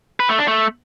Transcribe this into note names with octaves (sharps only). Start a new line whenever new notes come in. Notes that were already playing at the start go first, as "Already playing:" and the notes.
B4
A3
D4
A3